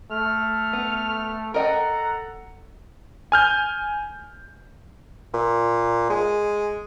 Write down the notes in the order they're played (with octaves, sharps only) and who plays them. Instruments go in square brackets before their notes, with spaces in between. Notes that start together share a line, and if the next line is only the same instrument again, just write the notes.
[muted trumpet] A3 [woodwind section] F6
[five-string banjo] B3
[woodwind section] A4 F#5 [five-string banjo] A#4 D#5 G5 [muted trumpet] A#5
[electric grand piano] G#5 F6 G6
[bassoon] A#2
G#3